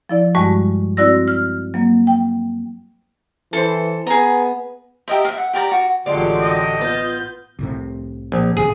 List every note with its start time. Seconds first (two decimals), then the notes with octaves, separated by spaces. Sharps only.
0.09 F3 E4 D5
0.35 G2 G3 G#3 F#4 A5 C#6
0.97 C4 E4 F#4 D5 E6 A#6
1.28 F6
1.74 F#3 A#3
2.07 G5
3.53 E3 A4 C5
4.07 B3 G#4 A#5
5.08 G4 A#4 D#5 E5
5.25 E5 F5
5.38 F#5
5.53 G4 A#4 D5 A#5
5.71 F#4
6.06 A1 D3 F#3 G#3 F4 G4 D5
6.41 D#5
6.81 B3 F4 G6
7.59 C2 A2 C3
8.32 A#1
8.57 D1 A1 C3 G#4